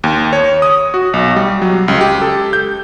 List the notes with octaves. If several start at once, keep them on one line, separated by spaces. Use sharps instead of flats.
D#2
C#5
D#6
F#4
B1
G3
F#3
C#2
G4
A4
G6